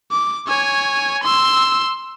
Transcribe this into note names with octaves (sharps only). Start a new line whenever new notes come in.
D6
C#5 G#5
C6 E6